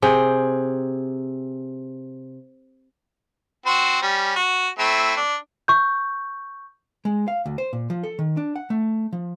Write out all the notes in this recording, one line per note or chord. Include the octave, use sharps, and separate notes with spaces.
C3 G#4 G5
C4 F#4 C5
G3 C#4
F#4
A3 C4 E4
D4
C#6 G6
G#3
F5
D2
C5
A#2
F3
A4
D#3
D4
F#5
A3
F3